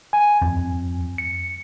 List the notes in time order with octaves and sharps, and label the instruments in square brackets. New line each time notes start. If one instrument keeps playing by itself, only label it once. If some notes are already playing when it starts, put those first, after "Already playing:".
[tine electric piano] G#5
F2
C#7